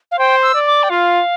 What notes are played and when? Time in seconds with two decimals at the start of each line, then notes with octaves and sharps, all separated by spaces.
0.11 F5
0.19 C5 G5
0.43 E6
0.54 D5
0.67 D6
0.83 G5
0.90 F4 F5